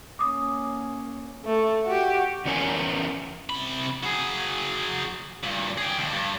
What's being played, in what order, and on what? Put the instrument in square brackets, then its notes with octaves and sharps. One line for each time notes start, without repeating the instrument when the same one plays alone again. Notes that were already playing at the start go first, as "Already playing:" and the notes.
[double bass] A#3 C#4 [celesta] D6 D#6
[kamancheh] A3
F#4 G4
[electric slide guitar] E2 E3 C#4 A#4 G#5
[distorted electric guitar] C3 B5
F#3 G#4
G2 A#2
G#4 G5
D#2 D3
G2